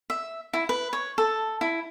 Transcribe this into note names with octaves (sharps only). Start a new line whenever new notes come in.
E5
E4
B4
C#5
A4
E4